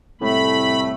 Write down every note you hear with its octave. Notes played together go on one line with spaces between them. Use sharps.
C2 A2 A3 B5